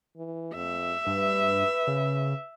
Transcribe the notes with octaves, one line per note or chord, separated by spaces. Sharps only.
E3
F2 E5
G2 B4
C#3